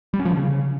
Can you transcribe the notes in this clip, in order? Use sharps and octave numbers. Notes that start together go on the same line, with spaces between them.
G3
C#4
F3
D3
C#3